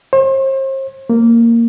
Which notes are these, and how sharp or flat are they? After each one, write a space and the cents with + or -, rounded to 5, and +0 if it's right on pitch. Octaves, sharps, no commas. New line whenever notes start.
C5 +40
A#3 -10